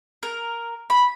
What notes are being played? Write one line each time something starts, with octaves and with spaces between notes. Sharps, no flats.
A#4
B5